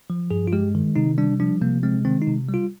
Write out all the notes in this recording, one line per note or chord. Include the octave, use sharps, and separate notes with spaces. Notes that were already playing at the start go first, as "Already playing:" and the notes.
F3
G2 G#4
F4
G#3 G4
D#3
C3 D#4
G3 D4
F3 D4
C3 A#3
G#3 C4
D#3 C4
D#4
C3
G3
F4